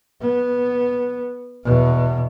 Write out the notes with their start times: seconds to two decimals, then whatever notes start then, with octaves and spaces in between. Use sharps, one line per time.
0.21 B3
1.64 E2 B2